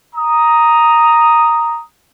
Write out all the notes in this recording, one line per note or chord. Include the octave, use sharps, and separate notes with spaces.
A#5 D#6